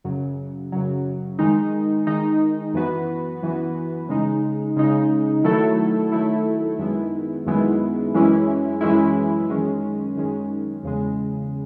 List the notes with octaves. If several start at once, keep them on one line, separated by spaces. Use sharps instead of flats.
F#2 C#3 F#3
F#2 C#3 F#3
D#3 G#3 D#4
D#3 G#3 D#4
F#2 E3 B3 F#4 B4
F#2 E3 B3 F#4 B4
C#3 G#3 D#4
C#3 G#3 D#4
D#3 F#3 A3 E4 A4
D#3 F#3 A3 E4 A4
F#2 D#3 G#3 B3 E4
F#2 D#3 G#3 B3 E4
F#2 E3 G#3 C#4 E4
F#2 E3 G#3 C#4 E4
F#2 D#3 G#3 C#4
F#2 D#3 G#3 C#4
E2 C#3 G#3